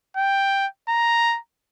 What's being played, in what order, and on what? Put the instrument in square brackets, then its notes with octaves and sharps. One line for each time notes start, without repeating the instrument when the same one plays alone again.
[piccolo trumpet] G5
A#5